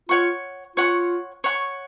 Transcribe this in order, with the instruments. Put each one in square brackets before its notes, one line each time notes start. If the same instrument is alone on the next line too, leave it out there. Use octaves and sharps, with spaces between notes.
[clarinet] F4 [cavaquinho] C#5 F#5 C#6
[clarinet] F4 [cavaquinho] C#5 F#5 C#6
[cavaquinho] C#5 F#5 C#6